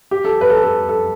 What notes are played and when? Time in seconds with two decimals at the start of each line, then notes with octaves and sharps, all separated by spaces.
0.11 G4
0.25 A4
0.41 B4
0.50 A4
0.63 A4
0.89 A4